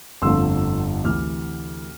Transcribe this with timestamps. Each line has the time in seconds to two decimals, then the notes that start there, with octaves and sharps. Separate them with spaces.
0.22 G1 F2 D3 F3 A3 C6 E6
1.04 D2 C3 E3 D6 F6